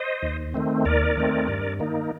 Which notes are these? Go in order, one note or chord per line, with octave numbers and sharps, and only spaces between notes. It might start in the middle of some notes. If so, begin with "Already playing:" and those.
Already playing: C5 D#5
D#2
D#3 A3 C4
D#2 A#4 D5
D#3 A3 C4
G2
D#3 A#3 D#4